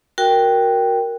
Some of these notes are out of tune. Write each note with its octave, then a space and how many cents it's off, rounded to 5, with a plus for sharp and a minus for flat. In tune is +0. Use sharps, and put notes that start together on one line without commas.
F#4 +0 A#4 +0 G5 +0